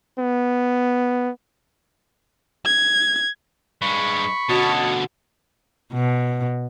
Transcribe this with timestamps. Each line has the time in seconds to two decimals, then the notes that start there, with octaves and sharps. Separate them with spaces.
0.19 B3
2.65 G#6
3.82 G2 G#3 B5 C#6
4.49 B2 D3 C#4 F#4 D#5 A5
5.93 B2